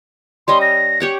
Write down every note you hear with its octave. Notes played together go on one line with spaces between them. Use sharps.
G3 C#4 D#5 C6
A#6
G4 C#5 F#5